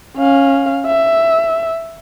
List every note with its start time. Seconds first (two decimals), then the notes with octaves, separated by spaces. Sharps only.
0.17 C#4 F5
0.87 E5